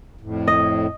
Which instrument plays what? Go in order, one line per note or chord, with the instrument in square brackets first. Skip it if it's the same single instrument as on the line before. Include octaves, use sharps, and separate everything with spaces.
[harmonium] F2 A2
[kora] D#5